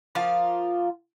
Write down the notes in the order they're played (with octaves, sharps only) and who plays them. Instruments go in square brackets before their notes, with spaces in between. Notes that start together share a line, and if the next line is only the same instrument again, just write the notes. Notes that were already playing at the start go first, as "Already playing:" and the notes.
[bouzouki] F3 A#3 F4 F5